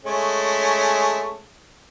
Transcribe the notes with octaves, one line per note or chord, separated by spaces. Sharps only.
G#3 A3 C#4